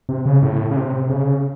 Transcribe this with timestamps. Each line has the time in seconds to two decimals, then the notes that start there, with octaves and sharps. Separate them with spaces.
0.09 C3
0.26 C#3
0.43 A2
0.71 C#3
0.76 C3
1.10 C#3